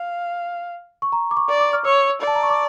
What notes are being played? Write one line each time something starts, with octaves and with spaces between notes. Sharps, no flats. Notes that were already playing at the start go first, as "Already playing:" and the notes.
Already playing: F5
C#6
A#5
D6
C#6
D5
D6
F6
C#5 E6
D5
A5
A#5
C#6
D6